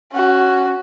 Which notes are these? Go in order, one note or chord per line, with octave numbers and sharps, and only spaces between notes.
C#4 F#4